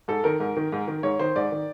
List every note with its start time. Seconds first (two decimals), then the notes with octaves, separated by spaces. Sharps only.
0.08 G#2 A4
0.24 D#3 A#4
0.40 G#2
0.57 D#3
0.72 G#2
0.88 D#3
1.03 G#2 C#5
1.19 D#3 C5
1.35 G#2 D5
1.52 D#3